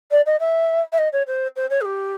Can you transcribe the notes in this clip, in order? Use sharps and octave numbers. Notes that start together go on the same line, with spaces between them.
D5
D#5
E5
E5
D#5
C#5
C5
C5
C#5
G#4
G4